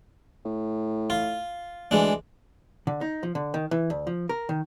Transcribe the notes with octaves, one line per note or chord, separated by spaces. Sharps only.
A2
F4
D2 E3 G#3 D4
D3
D#4
F3
D3
D#3
E3
D2
F3
A#4
D#3